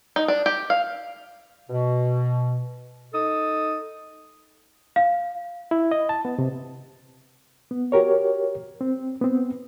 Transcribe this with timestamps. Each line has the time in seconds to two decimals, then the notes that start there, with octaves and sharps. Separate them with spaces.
0.16 D#4
0.28 D4
0.46 G4
0.70 F5
1.69 B2
3.14 D#4 A4 D#6
4.96 F5
5.71 E4
5.91 D#5
6.09 A5
6.25 B3
6.39 C3
7.71 B3
7.92 F#4 G4 A#4 C#5
8.81 C4
9.21 B3 C4